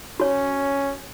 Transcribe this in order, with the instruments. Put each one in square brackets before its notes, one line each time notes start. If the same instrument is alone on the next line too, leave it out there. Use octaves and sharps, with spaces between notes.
[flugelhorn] C#4 [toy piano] F#4 C#5